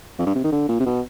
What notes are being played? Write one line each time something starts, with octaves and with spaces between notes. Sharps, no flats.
F2
G2
C3
D#3
D3
A#2
C3
B2